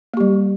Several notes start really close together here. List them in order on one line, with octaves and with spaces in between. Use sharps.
A#3 G4 G3